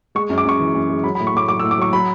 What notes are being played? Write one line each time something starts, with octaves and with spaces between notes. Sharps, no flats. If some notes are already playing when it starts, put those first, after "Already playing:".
G#3 C#6
F#2
D6
F#2 C#6
E3
F#2
G#3
F#3 B5
B5
A2
C#6
A2 D6
F#3 D6
E6
A2
D6
F#3 C#6
F#3 B5